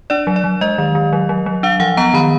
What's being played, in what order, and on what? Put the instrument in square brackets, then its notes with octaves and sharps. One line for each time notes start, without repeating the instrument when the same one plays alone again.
[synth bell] D4 D5
F#3
D5
F#3
G#3 D#5
D#3
D#3
F#3
F#3
F#3
D4 F5
F3 F#5
B3 A#5
D#3 B5